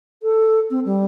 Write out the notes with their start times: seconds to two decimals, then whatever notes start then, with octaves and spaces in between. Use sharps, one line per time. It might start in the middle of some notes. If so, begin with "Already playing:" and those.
0.23 A4
0.70 C4
0.85 G3